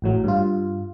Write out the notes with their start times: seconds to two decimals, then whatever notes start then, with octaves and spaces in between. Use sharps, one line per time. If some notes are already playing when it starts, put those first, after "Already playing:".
0.02 A1 A2 F#3
0.24 G2 F4